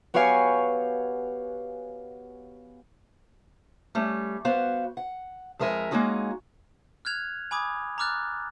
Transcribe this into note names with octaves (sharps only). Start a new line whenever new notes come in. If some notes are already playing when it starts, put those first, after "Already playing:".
B3 F#4 G4 C#5 F5 G#5
G3 A3 C#4
B3 F#4 C5 F5
F#5
F2 G#3 A#4 E5 G#5
G#3 A#3 C#4 D#4 F#4 G#4
F6 F#6 G#6 F7
G#5 B5 D6 D#6 G#6
A#5 B5 D6 F6 F#6 A6